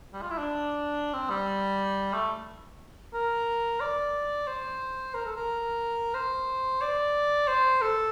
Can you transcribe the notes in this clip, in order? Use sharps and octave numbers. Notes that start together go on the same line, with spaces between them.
G3
F4
E4
D4
C4
G3
A3
A#4
D5
C5
A#4
A4
A#4
C5
D5
C5
A4